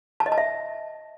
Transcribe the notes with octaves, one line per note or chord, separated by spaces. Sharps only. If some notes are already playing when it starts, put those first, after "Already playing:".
A5
D#5
A5
E5